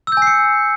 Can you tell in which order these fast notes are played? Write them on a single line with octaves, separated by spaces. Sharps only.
E6 G6 G#5 C7 C#7